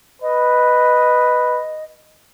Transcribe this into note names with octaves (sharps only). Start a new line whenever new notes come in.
B4 D#5